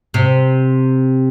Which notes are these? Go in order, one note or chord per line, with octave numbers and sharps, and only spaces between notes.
C3